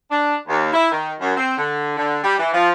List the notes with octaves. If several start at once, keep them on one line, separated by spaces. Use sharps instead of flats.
D4
D#2
E4
D#3
F#2
C4
D3
D3
G3
E3
F3